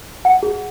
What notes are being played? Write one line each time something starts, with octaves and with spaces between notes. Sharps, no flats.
F#5
G#4